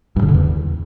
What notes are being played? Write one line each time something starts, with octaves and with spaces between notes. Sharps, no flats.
G2
C#3
D3
E2